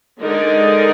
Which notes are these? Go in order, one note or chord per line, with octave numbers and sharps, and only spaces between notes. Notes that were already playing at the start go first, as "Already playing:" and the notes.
D3 G#3 D#4 A#4 D5